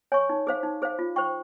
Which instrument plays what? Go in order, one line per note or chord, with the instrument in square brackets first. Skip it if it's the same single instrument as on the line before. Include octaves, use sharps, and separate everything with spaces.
[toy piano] C#5 G#5 C#6
D#4
G#4 C5 F5
D#4
G#4 C5 F5
F4
C5 G5 C#6